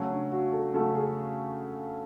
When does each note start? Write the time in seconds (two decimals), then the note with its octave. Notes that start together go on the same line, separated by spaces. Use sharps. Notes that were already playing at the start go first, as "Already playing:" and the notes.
Already playing: C#3 F#3 A3 C#4
0.11 D4
0.32 F#4
0.52 A4
0.74 C#3 F#3 A3 A4
0.95 G#4